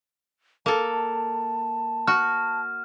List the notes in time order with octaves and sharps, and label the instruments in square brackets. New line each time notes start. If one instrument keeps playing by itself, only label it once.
[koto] A#3 A4 [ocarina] A5
[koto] F#4 [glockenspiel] F6